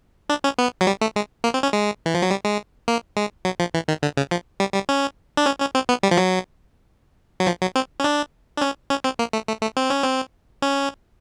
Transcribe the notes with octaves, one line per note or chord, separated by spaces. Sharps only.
D4
C#4
B3
F#3
G3
A3
G#3
A#3
C4
C#4
G#3
E3
F3
F#3
G3
G#3
A#3
G#3
F#3
F3
E3
D#3
D3
C#3
F3
G3
G3
C#4
D4
C#4
C#4
C4
B3
G3
F3
F#3
F#3
F3
F#3
C4
C#4
D4
D4
C#4
C#4
C4
A#3
A3
A3
A3
C4
C#4
C4
C#4